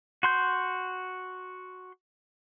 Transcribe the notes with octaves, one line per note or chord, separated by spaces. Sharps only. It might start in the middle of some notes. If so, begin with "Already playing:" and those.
F#4 C6 G6